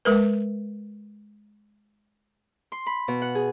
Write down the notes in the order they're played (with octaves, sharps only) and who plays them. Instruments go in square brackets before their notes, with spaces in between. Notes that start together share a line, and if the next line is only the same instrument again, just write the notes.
[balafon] G#3 A#4 B4
[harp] C6
B5
B2
F#5
G#4